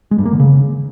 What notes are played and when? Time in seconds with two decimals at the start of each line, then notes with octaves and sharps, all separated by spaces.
0.11 G#3
0.18 G2
0.25 A#3
0.33 D3
0.40 C#3